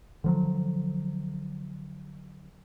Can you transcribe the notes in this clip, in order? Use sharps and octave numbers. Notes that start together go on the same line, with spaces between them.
D3 F3 F#3